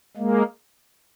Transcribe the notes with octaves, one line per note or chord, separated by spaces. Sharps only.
G#3 A#3